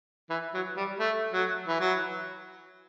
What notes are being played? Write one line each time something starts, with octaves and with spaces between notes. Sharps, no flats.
E3
F#3
G3
A3
F#3
E3
F#3